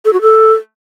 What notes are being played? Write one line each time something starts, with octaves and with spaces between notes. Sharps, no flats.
A4
F#4
A4